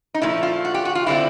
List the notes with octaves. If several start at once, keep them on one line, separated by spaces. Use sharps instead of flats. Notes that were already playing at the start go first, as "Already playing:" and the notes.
D#4
A#2 F3 A3 E4
F4
F#4
G4
F#4
F4
D3 G3 C4 E4